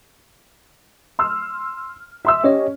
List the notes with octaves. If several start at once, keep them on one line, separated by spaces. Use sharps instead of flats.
C6 E6 F6
E5 C6 E6
C#4 G4 C#5 D#5